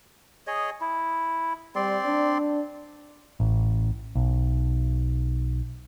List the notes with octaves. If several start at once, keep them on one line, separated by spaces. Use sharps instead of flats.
G#4 C#5 D#5
E4
G3 C4 D5 C6
D4
A1
B1